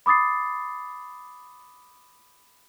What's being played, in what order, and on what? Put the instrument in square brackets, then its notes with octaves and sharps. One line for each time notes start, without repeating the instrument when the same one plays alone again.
[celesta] B5 D6 D#6 A6 C7